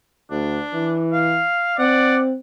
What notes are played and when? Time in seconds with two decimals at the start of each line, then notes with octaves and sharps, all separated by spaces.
0.31 D2 D4
0.74 E3
1.12 F5
1.79 C4 D5 F#5